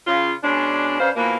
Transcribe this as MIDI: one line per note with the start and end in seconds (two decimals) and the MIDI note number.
0.07 0.33 49
0.07 0.33 65
0.43 0.99 47
0.43 0.99 56
0.43 0.99 61
0.43 0.99 62
1.00 1.10 49
1.00 1.10 61
1.00 1.10 62
1.00 1.10 71
1.00 1.10 72
1.00 1.10 77
1.16 1.37 47
1.16 1.37 52
1.16 1.37 53
1.16 1.37 58